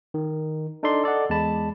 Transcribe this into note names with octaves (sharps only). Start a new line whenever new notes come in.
D#3
D4 D#4 A4 D5 C6
A4 D5 D#5 F#5
E2 G#3 A5 B5